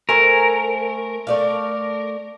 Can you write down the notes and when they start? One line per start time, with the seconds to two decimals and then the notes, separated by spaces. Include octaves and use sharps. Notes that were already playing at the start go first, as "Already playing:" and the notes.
0.09 A3 A#4 C5 G#5
1.27 A3 D5 F5